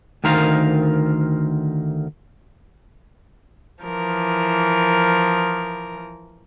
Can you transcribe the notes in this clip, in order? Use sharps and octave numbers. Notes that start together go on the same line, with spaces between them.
D2 D#3 A#4 C5 F5
E3 F3 A#4